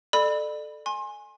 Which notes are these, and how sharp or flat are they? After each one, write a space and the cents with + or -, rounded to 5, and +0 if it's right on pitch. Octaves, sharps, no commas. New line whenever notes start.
A4 -5 D5 +35 B5 +0
G#5 +0 C6 +30